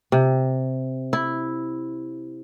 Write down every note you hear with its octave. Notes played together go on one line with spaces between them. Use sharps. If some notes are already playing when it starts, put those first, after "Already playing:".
C3
E4